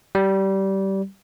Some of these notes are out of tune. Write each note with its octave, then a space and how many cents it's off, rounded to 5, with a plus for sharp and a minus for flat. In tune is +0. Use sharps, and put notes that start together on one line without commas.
G3 -20